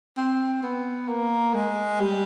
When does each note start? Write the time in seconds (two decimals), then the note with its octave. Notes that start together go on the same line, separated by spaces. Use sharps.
0.17 C4
0.63 B3
1.09 A#3
1.54 G#3
2.01 G3